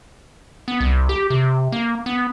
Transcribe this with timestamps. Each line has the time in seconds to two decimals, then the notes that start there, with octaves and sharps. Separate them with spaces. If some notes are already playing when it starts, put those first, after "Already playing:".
0.68 B3
0.80 C2
1.09 G4
1.30 C3
1.72 A#3
2.06 B3